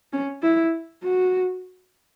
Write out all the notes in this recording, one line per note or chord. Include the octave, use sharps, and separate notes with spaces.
C#4
E4
F#4